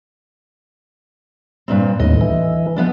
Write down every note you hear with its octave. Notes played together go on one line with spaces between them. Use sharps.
G2 A#2 C4
D#2 A2 D#5
E3
F3 B3 D4